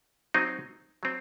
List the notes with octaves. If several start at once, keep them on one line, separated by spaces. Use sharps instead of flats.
F#3 C4 D#4
F#3 C4